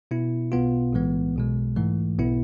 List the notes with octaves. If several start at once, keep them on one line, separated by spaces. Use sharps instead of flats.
B2 B3 E4
B1 B2 B3 F4
B1 A2 E3 G#3 B3
B1 B2 G#3
G#2 E3 A3
B1 B2 B3 E4